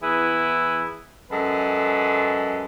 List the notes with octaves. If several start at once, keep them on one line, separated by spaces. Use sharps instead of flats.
E2 E4 G#4 B4
F#2 G#3 A4 B4